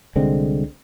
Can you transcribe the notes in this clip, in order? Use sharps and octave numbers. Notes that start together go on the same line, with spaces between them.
C2 D3 G#3 C4